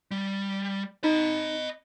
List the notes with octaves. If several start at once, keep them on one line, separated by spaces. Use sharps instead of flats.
G3
D#4 D#5 B5